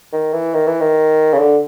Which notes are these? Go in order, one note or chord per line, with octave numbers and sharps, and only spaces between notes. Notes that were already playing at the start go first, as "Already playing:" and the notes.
D#3
E3
D#3
E3
D#3
C#3
D3